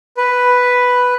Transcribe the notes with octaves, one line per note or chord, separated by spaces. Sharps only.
B4